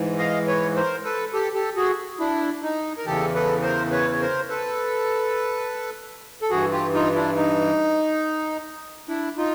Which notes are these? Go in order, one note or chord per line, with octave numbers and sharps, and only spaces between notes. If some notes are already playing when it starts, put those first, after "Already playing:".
Already playing: G#2 E3
D#5 F5
B4 C#5
A#4 C5
A4 B4
G4 A4
G4 A4
F#4 G#4
D4 E4
D#4
A#4
E2 C#3 E3 G4 A4
A4 B4
A#4 C5
B4 C#5
C#5
A#4 C5
A4 B4
A4
G2 E3 F#4 G#4
F4 G4
D#4 F4
D4 E4
D#4
D4 E4
D#4 F4